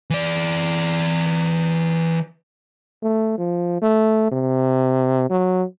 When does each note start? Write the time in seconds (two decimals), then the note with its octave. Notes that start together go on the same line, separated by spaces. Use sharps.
0.10 E3 D5
3.03 A3
3.38 F3
3.82 A3
4.32 C3
5.30 F#3